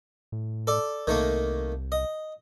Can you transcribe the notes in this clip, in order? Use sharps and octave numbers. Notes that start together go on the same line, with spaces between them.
A2
A4 D5
C2 D#3 A3 A#3
D#5